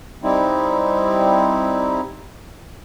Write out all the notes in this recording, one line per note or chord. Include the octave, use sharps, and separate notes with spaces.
G3 C4 D#4 E4